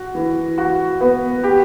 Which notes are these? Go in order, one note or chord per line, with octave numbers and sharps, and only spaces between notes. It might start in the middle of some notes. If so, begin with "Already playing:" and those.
Already playing: F#4
E3
F#4
B3
G4